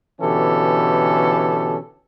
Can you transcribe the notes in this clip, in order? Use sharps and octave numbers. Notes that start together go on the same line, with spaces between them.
B2 D3 E3 C#4 G4 A4